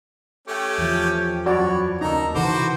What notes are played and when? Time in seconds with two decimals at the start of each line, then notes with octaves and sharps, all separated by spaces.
0.48 A3 C#4 G4 G5 C#6
0.78 E2 F3
1.46 F#2 F#4 C#5 D5 B5
2.01 D#2 C#3 D#4 A4 A#4 A#5
2.35 C3 D#3 E3 F#4 A4 B4 C5 D6